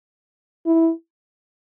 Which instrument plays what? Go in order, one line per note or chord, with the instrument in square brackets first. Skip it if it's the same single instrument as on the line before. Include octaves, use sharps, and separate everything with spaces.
[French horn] E4